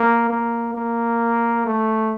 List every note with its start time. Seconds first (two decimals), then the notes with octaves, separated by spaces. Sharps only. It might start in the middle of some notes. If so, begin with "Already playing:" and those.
Already playing: A#3
0.30 A#3
0.74 A#3
1.66 A3